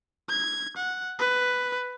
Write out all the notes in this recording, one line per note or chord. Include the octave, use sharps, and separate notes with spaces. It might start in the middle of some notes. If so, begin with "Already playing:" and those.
G#6
F#5
B4